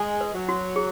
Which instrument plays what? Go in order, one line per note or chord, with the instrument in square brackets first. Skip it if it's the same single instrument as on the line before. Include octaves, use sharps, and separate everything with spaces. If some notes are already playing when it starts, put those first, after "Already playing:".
Already playing: [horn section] G#3 [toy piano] G#5
[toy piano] B4
[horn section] F#3
[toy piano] F#4
G#4